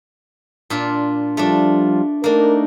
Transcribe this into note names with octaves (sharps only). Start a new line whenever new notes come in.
A#2 D4 F4
F3 G3 A3 D4 F4
A3 A#3 D4 D#4 A#4